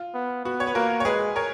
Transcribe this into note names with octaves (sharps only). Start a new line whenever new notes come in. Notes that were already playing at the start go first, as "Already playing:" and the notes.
Already playing: F4
B3
B3 F#4
C#5
B4
A#3 F#4 A#4
C#5
G#3 G#4 B4
A#4 C#5